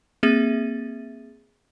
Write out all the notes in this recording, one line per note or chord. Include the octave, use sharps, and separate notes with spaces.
A#3 C4 G#4 E5 A6 D#7